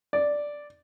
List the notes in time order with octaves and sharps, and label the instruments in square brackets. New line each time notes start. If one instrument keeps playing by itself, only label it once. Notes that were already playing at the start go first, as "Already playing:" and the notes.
[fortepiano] D5